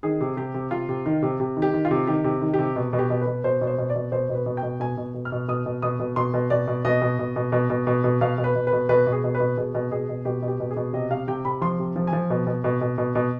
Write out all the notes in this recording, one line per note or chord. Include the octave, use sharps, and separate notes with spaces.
D#3 G#4
C3
C3 G4
C3
C3 F4
C3
D#3
C3
C3
D#3
G4
D#3
F4
C3
D#3 G4
C3
D#3
G4
C3
B2
B2
G4
B2
B2 B4
B2 C5
B2
C5
B2
D5
B2
B2 C5
B2
B4
B2
G5
B2
B2 G#5
B2
B2
F6
B2
B2 D#6
B2
B2 D#6
B2
B2 C6
B2
B2 D5
B2
B2 D#5
B2
B2
B2
B2
B2
B2
B2
B2 F5
B2
B4
B2
B4
B2
B2 B4
B2
G#4
B2
B4
B2
B2 G#4
B2
B2 G#4
B2
B2 G4
B2
G4
B2
G#4
B2
C3 D#5
C3 F5
C3 G5
C3 B5
F3 C6
C3
F3
G#5
F3
B2
B2
B2
B2
B2
B2